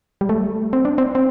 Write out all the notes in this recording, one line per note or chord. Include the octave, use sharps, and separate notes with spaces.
G3
A3
C4
D4
C4
C4